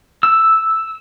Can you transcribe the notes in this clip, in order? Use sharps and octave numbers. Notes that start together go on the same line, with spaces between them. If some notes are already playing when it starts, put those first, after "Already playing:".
E6